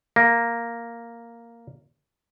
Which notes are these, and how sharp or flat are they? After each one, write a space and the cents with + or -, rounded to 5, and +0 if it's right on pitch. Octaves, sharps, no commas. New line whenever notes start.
A#3 -5